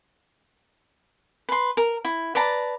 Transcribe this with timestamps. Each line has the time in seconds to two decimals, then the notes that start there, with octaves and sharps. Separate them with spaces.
1.49 B4 C6
1.77 A#4
2.05 E4
2.35 B4 D5 A5 A#5